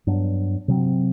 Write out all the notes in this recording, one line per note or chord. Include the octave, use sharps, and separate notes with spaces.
G2 F#3 B3 D4
C3 F#3 C4